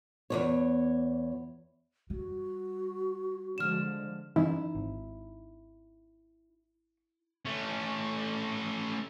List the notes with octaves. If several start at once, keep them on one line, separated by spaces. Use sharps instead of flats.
E2 C3 C#5
G3 F#4
D3 F3 G#3 F6 E7
E3 C#4 D#4 E4
G#1
A3 C#4